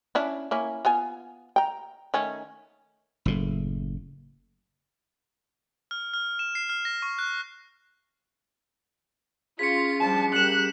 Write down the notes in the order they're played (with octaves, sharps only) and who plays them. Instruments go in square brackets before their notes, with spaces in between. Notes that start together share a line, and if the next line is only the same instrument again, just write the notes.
[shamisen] C#4 D4 E4
A#3 C#4 E4
B3 F4 G#5
G5 A#5
D#3 A3 C#4
[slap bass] F#1 A2
[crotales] F6
F6
E7
C7
F6
A#6
C#6
F#6
[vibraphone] C#4 G#4 [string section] F4 [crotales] B6 C#7
[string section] F3 G3 D4 [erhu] A5
[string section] G3 A#3 G4 [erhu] F#6 [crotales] C#7 E7